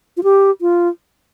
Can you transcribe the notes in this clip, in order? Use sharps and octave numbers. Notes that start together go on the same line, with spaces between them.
F4
G4
F4